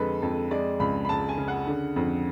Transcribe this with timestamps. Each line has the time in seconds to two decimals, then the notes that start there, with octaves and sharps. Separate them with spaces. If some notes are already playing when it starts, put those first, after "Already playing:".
Already playing: F2 D3 G#3 A4 B4
0.22 F2 A4
0.51 G#3 D5
0.80 C#2 B5
1.05 B5
1.09 C#2 A5
1.29 G#5
1.38 C#3
1.48 F#5
1.67 D3
1.96 F2